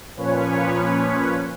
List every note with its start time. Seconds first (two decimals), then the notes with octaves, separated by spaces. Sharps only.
0.17 A#2 F3 C#4 B4 C#5